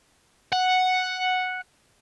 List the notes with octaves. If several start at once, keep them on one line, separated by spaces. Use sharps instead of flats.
F#5